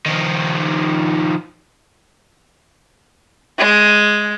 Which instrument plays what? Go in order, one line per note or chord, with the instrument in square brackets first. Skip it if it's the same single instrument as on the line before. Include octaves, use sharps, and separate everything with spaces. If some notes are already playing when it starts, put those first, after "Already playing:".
[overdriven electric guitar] D#3 F3
[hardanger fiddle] G#3